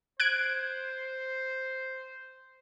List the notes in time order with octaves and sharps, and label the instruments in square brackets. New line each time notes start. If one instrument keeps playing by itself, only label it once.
[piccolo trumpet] C5 [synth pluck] F#6 G#6 D7